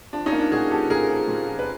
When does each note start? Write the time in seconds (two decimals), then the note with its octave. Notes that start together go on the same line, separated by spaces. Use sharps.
0.13 F3 D4
0.26 C#4 D#4
0.32 A#3
0.39 D4
0.52 A#2 F#4 G#4
0.71 F3 G4 A4
0.90 A#2 G#4 A#4
1.09 F3
1.28 A#2
1.48 F3
1.59 B4